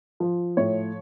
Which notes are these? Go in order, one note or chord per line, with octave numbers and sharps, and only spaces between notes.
F3
A2 C#5